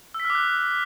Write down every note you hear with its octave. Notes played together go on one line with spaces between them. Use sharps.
E6
B6
F6
D6
F#6